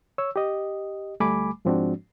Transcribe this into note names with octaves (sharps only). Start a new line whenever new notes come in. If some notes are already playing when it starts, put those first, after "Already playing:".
C#5 E6
G4 D#5
D2 G3 A3 G#5 B5 D6
G#2 F3 G#3 C4 D4 F#4